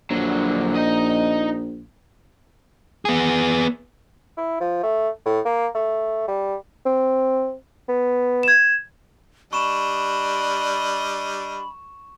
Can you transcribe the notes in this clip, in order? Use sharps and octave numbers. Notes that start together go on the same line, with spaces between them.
A#1 D3 F#3
D#4 D#5
B3 G#4
E4
F3
A3
A2
A#3
A3
G3
C4
B3
G#6 E7
G3 D4 D#5 B5 C#6 E7